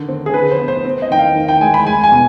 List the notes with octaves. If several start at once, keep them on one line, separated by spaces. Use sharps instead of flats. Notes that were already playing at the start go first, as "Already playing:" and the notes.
Already playing: D3 D#3
C4
G#4
D3 B4
C5
B3
C5
C4
D#5
D#3 G5
F5
D#3
G5
G#3 G#5
B5
G#3 G#5
G#5
B2